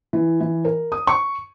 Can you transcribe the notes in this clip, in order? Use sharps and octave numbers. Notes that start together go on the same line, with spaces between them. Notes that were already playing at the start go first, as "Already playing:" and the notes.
E3
E3
A#4
D#6
C#6